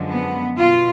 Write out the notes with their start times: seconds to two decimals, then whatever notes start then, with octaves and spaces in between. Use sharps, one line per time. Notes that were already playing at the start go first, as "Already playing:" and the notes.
Already playing: F#2 D3 F3 G#3
0.08 B3
0.58 B2 F4